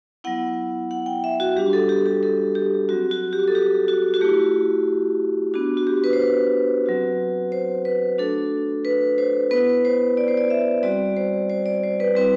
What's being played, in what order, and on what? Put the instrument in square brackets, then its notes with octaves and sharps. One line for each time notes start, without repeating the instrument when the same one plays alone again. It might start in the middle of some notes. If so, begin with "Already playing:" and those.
[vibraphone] F#3 B3 E4 F#5
F#5
G5
E5
F#4
G3 D4 F#4 G4
A4
G4
G4
A4
G4
F#3 C4 F#4
F#4
G4
A4
G4
F#4
F#4
A3 E4 G4
B3 D4 F#4
F#4
G4
B4
C5
B4
F#3 C4 F#4
C5
B4
A3 D4 F#4 A4
B4
C5
B3 E4 B4
C5
D5
C5
D5
E5
G3 C4 F#4 D5
C5
C5
D5
C5
B4
G3 C4 E4 B4